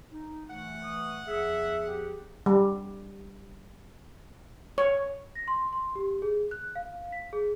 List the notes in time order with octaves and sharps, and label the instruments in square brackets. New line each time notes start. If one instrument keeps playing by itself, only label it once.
[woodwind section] D#4
[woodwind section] E3 A3 [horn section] F#5
[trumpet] D#6
[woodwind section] E2 F3 G#4 [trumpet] E5
[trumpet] G4
[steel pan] G3
C#5
[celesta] A#6
C6
C6
G4
G#4
F#6
F5
B6
G#4